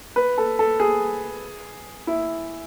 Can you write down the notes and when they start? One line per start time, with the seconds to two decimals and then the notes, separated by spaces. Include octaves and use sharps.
0.16 B4
0.38 A4
0.59 A4
0.80 G#4
2.07 E4